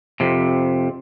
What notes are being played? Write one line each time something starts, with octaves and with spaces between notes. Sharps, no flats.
F2 C3